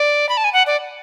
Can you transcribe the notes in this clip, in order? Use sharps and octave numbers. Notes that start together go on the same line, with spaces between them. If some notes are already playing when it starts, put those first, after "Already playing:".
Already playing: D5
B5
A5
G#5
F#5
D5